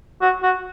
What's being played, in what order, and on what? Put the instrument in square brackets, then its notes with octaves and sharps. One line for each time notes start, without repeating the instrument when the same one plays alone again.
[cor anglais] F#4
F#4